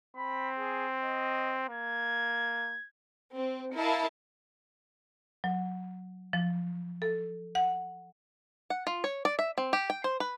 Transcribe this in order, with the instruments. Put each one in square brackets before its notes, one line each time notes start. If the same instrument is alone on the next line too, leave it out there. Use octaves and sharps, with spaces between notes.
[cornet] C4 [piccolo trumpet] B5
[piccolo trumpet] G#4
D#5
[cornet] A#3 [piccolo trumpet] G#6
[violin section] C4
E4 A#4 D#5 F5 A5
[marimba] F#3
F3
A4
F#5
[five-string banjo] F#5
F4
C#5
D5
E5
C4
G4
G5
C5
B4